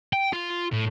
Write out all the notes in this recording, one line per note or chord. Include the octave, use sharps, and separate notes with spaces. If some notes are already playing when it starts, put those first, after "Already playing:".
G5
F4
A2